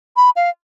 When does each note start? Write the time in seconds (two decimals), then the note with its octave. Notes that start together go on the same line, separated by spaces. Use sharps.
0.17 B5
0.36 F5